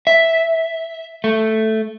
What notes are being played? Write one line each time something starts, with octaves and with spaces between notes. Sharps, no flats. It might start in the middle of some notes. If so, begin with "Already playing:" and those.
E5
A3